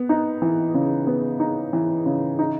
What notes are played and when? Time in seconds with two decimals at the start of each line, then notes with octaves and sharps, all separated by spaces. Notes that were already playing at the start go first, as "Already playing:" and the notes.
Already playing: B3
0.09 D#4
0.42 E3
0.74 C#3
1.07 B3
1.40 D#4
1.73 E3
2.06 C#3
2.39 D#4